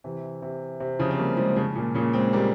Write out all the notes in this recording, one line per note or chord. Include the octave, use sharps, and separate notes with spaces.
C3 E3
C3
C3
C#3 F3
C4
G3 A#3
F3 G#3
C#3 F3
A#2
A#2 C#3
G#3 C4
G3 A#3